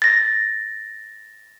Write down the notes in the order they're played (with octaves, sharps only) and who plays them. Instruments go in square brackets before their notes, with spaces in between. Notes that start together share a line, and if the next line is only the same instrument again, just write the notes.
[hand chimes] A6 A#6